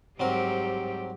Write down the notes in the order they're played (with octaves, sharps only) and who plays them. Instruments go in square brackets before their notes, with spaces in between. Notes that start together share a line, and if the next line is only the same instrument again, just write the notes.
[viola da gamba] G#2 G3 G4 [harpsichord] F#3 C4 A#4